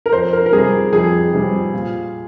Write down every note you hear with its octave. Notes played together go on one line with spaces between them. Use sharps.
A#4
F2 C5
A#4
A#4
C3 G3 G#4
F2 G#4
C3 G3
A#2